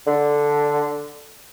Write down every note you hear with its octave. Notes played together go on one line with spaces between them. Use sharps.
D3